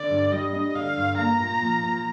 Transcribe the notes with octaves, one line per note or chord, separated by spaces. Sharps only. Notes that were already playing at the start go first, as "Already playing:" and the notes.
Already playing: D3 D5
G2
G3 D#5
D4
D3 F5
G2
A#3 A#5
A#2
F3
A#2